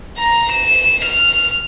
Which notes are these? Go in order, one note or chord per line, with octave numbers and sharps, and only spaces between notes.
A#5
E7
F6